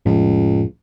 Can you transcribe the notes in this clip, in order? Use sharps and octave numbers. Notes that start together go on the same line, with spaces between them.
F1 C#2 A2 F3